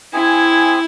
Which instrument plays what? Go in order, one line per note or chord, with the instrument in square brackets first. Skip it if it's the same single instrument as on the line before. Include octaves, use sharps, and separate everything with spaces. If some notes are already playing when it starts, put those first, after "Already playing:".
[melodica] C4 G#4 G#5 [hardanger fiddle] E4